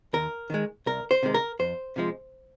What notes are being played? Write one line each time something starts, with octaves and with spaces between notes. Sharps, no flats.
D#2 A#4
D#3 G#3
C2 A#4
C5
C3 D#3 G#3
A#4
F2 C5
C3 F3 G#3